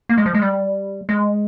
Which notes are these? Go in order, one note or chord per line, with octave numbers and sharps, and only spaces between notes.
A#3
G#3
F3
G#3
G3
G#3